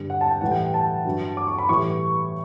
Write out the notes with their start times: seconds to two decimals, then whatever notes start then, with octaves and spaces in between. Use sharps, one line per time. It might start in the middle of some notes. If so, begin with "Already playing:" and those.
Already playing: G2 D3 G3
0.10 F#5
0.21 A5
0.31 G5
0.41 A2 E3 G3 F#5
0.52 G5
0.74 A5
1.05 G2 F#3
1.37 D6
1.47 C#6
1.58 B5
1.69 A2 E3 G3 C#6